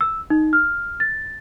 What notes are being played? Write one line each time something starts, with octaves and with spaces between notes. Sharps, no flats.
E6
D#4
F6
A6